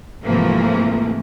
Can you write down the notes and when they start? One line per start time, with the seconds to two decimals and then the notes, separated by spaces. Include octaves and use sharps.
0.23 G#2 C3 E3 F3 A3 A#3